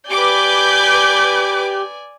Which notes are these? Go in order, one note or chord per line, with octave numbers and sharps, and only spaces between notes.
G4 B4 D5 G#5 D6 G6